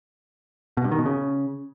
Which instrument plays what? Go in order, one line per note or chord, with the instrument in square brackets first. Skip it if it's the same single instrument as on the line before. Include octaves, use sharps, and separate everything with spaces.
[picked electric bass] B2
G2
D#3
B2
C#3